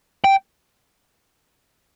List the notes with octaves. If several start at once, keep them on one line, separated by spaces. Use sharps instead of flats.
G5